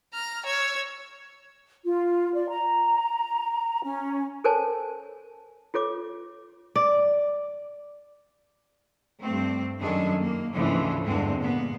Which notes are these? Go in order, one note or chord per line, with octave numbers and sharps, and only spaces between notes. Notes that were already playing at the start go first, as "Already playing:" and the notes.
A#5 F6
C#5 E6
F4
D5
A#5
C#4
A4 A#4 C5 C#5 G#5 A5
F4 A4 C#5 D6
D5
G2 A3 C4
F#2 D#3 D4 G#4 A4
A#3
D2 G#2 C#3 E3 F3
E2 G2 D3 G#3 C4
A#2 A#3 B3